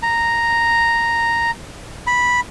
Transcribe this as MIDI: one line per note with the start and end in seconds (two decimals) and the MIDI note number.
0.03 1.51 82
2.07 2.40 83